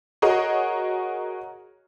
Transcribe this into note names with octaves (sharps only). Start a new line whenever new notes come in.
F#4 G#4 A#4 C#5 D#5